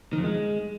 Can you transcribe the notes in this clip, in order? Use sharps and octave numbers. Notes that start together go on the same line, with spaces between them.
D#3
F2
G#3